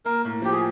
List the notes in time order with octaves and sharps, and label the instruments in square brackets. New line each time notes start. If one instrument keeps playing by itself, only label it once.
[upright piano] A#3 [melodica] A#4
[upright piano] A2
[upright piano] F3 [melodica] G4
[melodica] G#4